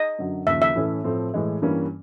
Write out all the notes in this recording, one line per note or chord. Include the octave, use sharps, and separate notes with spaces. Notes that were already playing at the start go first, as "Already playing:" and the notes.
Already playing: D#5
F#2 D3 F#3
D#2 C#3 F3 E5
E5
A2 E3 A3 C#4
A2 F3 A3 C4
A2 E3 G#3
G2 E3 G3 A#3 C#4